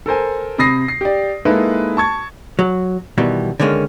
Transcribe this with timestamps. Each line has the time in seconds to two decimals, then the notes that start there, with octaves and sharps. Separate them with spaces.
0.06 A4 A#4 C5 G#5
0.58 C3 B5 D#6 A#6 C7
0.88 C7
1.01 G4 D5
1.45 G#3 A#3 D#4 E4 A4 B4
1.97 A5 C#6 G#6
2.59 F#3
3.18 B2 D#3 E3 G3
3.60 D3 D#3 G#3 A#3 C#4